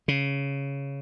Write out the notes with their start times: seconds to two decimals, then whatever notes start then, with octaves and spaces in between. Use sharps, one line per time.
0.08 C#3